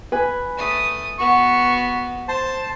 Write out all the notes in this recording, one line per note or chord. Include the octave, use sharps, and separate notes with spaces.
B4 G#5
A3 D#6
B3 F#4 C#6
C5 A5